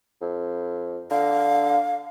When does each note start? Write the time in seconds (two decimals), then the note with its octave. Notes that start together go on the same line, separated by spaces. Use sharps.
0.21 F2
1.11 D3 F5